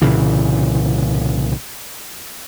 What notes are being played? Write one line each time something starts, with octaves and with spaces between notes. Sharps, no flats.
C2 A#2 C#3 E3